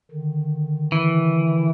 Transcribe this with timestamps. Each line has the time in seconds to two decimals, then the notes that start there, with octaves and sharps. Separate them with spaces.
0.11 D3 D#3
0.92 E3